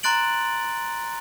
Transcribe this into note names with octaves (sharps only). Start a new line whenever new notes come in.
A#5 C6 F#6 A6 D7 F#7